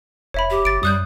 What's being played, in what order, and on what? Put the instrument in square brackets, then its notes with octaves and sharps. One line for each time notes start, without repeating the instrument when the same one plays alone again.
[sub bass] F1 [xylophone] C#5 E5 B5
[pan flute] G4
[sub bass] G1 [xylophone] A6 D7
[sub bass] F#2 [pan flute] G3 [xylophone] D#6 F#6 G6